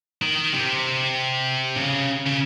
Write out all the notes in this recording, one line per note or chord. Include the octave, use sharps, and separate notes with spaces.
D#3
C3
C#3
C#3